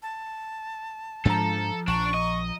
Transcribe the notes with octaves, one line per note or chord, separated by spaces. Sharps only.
A5
G#2 F3 G#3 D4 A4 A#5
A#1 D4 C#6
D#5